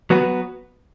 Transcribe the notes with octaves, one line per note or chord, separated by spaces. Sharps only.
F#3 B3 F#4 B4